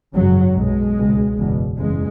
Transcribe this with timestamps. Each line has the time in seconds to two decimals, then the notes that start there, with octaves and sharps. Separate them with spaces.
0.14 G#1 F#2 C#3 F#3
0.55 B1 B2 G#3
0.96 C#2 B2
1.37 F#1 E2 B2
1.78 F#1 E2 C#3 G#3